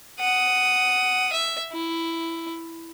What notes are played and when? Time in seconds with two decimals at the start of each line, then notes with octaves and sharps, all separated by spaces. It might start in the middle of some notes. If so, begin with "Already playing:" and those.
0.19 F#5 D#6
1.33 E5
1.73 E4